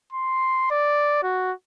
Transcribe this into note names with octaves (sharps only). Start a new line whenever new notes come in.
C6
D5
F#4